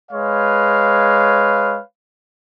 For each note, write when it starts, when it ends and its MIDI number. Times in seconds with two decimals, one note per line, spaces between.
0.12 1.80 56
0.12 1.80 71
0.12 1.80 73
0.12 1.80 77